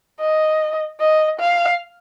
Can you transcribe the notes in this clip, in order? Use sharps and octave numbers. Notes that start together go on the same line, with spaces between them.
D#5
D#5
F5